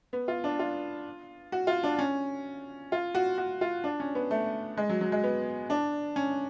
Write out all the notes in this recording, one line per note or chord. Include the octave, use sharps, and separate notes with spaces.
B3
F4
D4
F4
F#4
F4
D4
C#4
F4
F#4
F#4
F4
D4
C#4
B3
A3
G#3
F#3
F#3
G#3
B3
D4
C#4